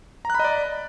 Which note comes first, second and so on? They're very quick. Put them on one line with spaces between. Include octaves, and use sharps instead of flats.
A#5 F#6 B5 D#5 D5